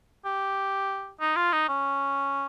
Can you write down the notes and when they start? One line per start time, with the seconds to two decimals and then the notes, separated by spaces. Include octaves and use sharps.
0.25 G4
1.20 D#4
1.36 F4
1.53 D#4
1.68 C#4